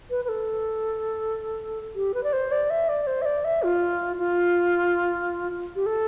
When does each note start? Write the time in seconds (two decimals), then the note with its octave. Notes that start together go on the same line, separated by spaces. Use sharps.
0.10 B4
0.25 B4
0.29 A4
1.95 G4
2.14 B4
2.24 D5
2.33 C5
2.52 D5
2.70 E5
2.89 D5
3.07 C5
3.22 E5
3.25 D5
3.45 E5
3.63 F4
4.18 F4
5.76 G4
5.86 A4